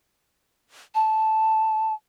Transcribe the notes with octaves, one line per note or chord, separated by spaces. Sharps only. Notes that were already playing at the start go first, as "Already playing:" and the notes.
A5